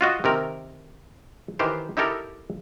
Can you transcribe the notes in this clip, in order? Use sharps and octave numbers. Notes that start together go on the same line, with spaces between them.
F4 F#4 D#5
C3 D#3 A#4
D#3 E3 G4 C5
D#4 E4 G4 A4 A#4